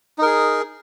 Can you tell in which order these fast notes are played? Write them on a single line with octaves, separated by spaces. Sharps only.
D#4 A#4 G#4